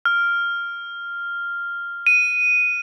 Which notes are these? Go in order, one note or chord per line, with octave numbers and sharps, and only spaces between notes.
F6
D#7